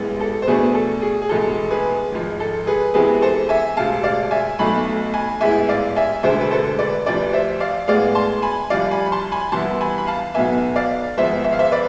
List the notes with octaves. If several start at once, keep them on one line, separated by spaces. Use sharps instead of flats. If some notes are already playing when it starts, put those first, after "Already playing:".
Already playing: A1 G#2 G#3 B3 E4
A4
C5
E2 B2 A3 D4 G#4 B4
A4
G#4
G#4
F1 E2 B2 G#3 A4
G#4 B4
G#1 G#2 F3
A4
G#4 B4
E2 C3 E3 G#3 C4 G#4 B4
A4 C5
E5 G#5
E1 D2 C3 F5 A5
D5 F5
E5 G#5
B1 B2 A3 G#5 B5
G#5 B5
A1 G#2 G#3 B3 E4 E5 G#5
D5 F5
E5 G#5
E1 D2 D3 G#3 C5 E5
B4
A4 C5
B4 D5
D2 C3 F3 B4 D5
C5 E5
D5 F5
A2 G#3 B3 D5 F5
A5 C6
G#5 B5
C2 C3 F3 D5 F5
G#5 B5
B5
A5 C6
G#5 B5
C2 C3 E3 B3 E4 A5 C6
G#5 B5
B5
F5 A5
B1 B2 B3 E5 G#5
D5 F5
G#1 G#2 F3 G#3 B3 C5 E5
E5
F5
C5 E5
B4 D5